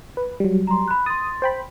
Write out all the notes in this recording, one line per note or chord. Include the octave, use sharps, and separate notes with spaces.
B4
F#3 G3
A#5 C6
B5 F#6
C6 D#6 A6
C5 G5 B5